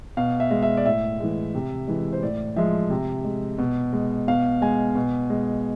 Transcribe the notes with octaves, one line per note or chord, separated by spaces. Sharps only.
B2 F5
E5
G#3
E5
D5
A2 E5
E3 G#3
C3
E3 G#3
C5
A2 D5
F3 G#3 E5
C3
G#3
B2
G#3
B2 F5
G#3 G#5
B2
G#3